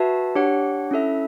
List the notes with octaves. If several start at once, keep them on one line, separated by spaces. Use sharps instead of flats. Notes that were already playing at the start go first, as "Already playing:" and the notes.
Already playing: F#4 B4 E5 A5
D4 G4 C#5 F#5
C#4 E4 A4 E5